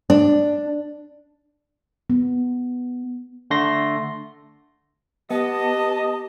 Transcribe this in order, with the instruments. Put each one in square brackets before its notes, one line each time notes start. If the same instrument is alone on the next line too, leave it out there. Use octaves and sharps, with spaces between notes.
[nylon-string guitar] D4
[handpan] B3
[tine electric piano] D3 A3 C6 A#6
[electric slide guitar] B3 [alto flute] G4 [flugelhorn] D#5 [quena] A5